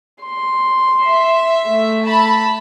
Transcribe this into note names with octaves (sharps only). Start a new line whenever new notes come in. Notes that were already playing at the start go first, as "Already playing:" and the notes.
C6
E5
A3
A5 B5